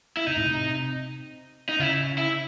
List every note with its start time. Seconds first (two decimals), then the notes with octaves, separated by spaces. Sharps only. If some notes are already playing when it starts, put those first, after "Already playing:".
0.17 E4
0.26 C3 D#4
0.36 A2
0.46 C3
1.69 D#4
1.79 C#3 E4
2.18 E4